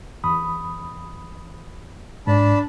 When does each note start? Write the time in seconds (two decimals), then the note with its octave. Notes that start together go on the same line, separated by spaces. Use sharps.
0.24 E2 B5 D#6
2.27 G#2 D4 A5 B5